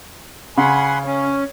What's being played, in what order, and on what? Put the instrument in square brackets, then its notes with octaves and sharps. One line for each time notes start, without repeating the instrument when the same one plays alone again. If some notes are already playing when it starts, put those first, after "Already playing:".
[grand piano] C#3 [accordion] F#5 B5 C6 [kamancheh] G#5
[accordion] C#4 [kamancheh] C#5